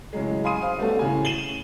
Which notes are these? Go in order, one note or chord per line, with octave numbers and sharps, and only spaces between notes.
A2 C#3 F#3 G#3
F5 G#5 B5 C6 D#6 D#7
C5 F5
G3 A3 B3 C#4 F#4 A4
A2 C#3 G#5
D#7 E7 F#7 G7